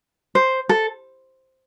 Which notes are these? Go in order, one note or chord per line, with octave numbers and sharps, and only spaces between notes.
C5
A4